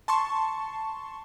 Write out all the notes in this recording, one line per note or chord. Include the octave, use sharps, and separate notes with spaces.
A5 C6 C#6